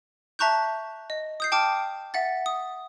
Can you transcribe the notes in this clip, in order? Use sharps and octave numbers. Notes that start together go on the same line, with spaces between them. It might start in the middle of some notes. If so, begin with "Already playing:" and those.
E5 A5 A#5 C#6 F#6 G6
D#5
D#6 G6 C7
G5 A5 D6 F6
E5 F#5 A6
D#6